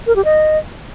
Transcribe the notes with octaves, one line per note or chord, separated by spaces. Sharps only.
A#4
G4
D#5